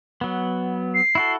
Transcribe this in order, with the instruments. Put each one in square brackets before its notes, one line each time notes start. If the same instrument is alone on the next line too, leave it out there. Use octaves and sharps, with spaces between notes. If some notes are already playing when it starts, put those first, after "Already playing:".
[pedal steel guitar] F#3 B3
[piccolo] C7
[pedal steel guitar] E4 F#4 A4